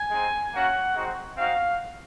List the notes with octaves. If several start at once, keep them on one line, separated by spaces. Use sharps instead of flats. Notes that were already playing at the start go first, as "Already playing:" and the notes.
Already playing: G#5
G#3 C4 D#4
A#3 C#4 F#4 F#5
G#3 C4 D#4 F#4
C4 D#4 F#4 F5